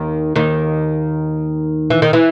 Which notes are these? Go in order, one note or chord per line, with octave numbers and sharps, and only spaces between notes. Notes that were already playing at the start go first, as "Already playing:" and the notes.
Already playing: D#2 D#3
D#2 D#3
E3
D#3
E3